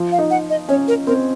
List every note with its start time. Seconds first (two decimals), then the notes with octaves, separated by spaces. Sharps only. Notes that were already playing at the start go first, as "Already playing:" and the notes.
Already playing: F3
0.12 F5
0.18 D#4
0.31 F#5
0.50 D#5
0.69 C#4 C#5
0.88 A#4
1.07 C4 A#4